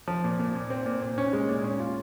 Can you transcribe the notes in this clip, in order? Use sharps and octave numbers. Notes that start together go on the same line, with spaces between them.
F3
A#2
A#2
A#2
C4
A#2
A#2
C#4
G#3
A#2
C#4
F4